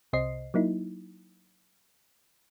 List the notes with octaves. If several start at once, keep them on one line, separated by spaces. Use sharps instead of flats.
C2 C3 C5 D#5 C7
F#3 A#3 D#4 E4